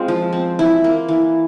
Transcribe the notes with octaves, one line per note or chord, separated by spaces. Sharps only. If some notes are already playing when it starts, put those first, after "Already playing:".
Already playing: G#3 C4 F4
F3
C4
E3 E4
A#3
E3